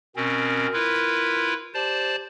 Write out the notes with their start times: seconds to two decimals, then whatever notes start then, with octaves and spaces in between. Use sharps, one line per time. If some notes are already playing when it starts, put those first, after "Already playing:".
0.16 B2 C4 C#4 A#4
0.73 E4 F4 B4
1.74 G4 C5 D5 A5